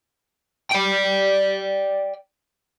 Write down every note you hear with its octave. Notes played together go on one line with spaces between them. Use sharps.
D5 G5